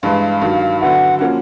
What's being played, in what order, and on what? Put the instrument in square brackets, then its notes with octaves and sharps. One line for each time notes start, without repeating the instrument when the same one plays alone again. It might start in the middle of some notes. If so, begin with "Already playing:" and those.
[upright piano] G2 E3 G#3 [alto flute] F5
[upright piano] G2 D#3 F#3
[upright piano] D3 F#3 B3 E4 [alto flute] F#5
[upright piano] F3 A#3 C#4 F#4 [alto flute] F#5